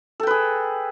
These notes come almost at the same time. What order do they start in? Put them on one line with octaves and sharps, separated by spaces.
A4 G5 B4 G#4